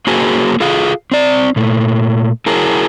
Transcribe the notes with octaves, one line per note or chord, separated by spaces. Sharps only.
A#3 F#4 G#4 A#4 C5 G#5
F4 G#4 A4 F5
C4 D5
A#2 A3
E4 F#4 G#4 A#4